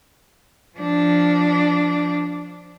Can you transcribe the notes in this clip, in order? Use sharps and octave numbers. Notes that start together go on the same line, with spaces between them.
F3 D4